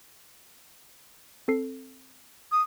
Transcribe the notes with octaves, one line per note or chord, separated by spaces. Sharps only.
C4 A4 C7
D#6